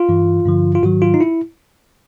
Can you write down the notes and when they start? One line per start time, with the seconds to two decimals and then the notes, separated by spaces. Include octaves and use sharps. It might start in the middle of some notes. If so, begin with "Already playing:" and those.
Already playing: F4
0.09 G2 E3
0.46 G2 D3 F3
0.75 F4
0.83 G#2 D#3 F#3 F#4
1.02 F4
1.14 D#4
1.21 E4